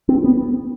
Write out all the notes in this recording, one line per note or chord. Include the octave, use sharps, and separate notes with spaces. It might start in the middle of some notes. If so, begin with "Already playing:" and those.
C4
B3